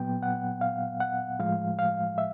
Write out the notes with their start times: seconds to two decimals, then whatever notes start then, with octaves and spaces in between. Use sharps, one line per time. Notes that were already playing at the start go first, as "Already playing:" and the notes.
Already playing: A#2 F#3 B3 G5
0.23 F#5
0.61 F5
1.00 F#5
1.39 A2 F3 G#3 F5
1.79 F5
2.18 E5